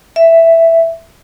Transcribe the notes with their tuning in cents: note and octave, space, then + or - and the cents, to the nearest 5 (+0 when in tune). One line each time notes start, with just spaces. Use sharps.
E5 +5